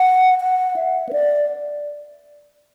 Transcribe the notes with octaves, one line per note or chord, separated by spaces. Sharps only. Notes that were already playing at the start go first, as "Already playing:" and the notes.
Already playing: F#5
F#5
E5
B4
D5